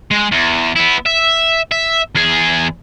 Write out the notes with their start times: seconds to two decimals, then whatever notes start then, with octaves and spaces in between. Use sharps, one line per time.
0.11 G#3
0.31 E2
0.76 B3 E4
1.06 E5
1.71 E5
2.15 E2 G#4